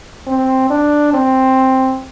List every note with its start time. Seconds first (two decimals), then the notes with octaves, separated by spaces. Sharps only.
0.27 C4
0.70 D4
1.14 C4